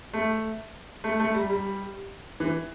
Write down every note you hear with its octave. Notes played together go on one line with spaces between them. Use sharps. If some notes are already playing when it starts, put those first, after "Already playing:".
A3
A3
A3
G3
G3
E3